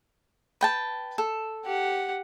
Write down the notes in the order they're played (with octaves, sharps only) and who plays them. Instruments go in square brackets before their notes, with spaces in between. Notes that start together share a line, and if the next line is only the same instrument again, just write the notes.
[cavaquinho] B4 G5 A5
A4
[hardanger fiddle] G4 F#5